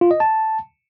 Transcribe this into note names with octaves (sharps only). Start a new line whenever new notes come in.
F4
D#5
A5